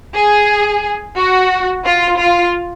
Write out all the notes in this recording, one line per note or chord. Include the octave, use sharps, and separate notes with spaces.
G#4
F#4
F4
F4